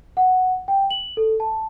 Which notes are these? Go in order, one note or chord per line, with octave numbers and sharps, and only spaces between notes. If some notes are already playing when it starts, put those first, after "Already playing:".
F#5
G5
F#7
A4
A5